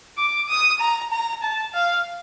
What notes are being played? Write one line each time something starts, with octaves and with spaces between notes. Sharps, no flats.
D6
D#6
A#5
A#5
A5
F5